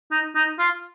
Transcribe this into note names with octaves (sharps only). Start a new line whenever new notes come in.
D#4
D#4
F4